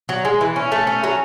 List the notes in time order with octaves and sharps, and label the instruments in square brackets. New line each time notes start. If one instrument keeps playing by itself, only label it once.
[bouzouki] F#3
G#3
E3
C#4
A3
C#4
F#3